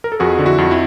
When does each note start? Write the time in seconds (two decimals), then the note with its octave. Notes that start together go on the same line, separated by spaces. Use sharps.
0.04 A#4
0.12 A4
0.20 F2 F#4 G#4
0.39 D3
0.45 E4 F#4
0.58 F2
0.71 E4